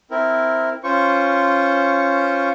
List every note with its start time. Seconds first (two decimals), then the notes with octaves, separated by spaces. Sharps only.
0.11 C4 E4 A#4
0.84 C#4 F4 C5 C#6